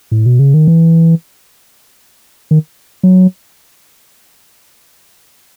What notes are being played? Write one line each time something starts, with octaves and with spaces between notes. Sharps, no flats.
A2
B2
C#3
D#3
E3
D#3
F#3